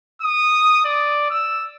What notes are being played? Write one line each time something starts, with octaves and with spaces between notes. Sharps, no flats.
D#6
D5
E6